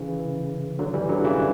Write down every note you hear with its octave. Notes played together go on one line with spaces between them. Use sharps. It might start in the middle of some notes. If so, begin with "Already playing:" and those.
Already playing: C#3 E3
D3 F#3
E3 G3
D3 F#3
C#3 E3